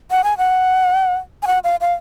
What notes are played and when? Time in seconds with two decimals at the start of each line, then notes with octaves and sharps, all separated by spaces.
0.11 F#5
0.24 G#5
0.38 F#5
1.43 G#5
1.47 F#5
1.64 F5
1.81 F5